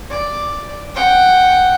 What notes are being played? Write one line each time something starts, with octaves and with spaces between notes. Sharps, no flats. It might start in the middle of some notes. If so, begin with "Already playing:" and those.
D5
F#5 G5